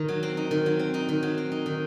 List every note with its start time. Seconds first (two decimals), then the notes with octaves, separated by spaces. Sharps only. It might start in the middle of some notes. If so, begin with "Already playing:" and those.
Already playing: D#3 D#4
0.08 F#3
0.23 C4
0.37 D#4
0.51 D#3
0.66 F#3
0.79 C4
0.94 D#4
1.09 D#3
1.23 F#3
1.38 C4
1.52 D#4
1.66 D#3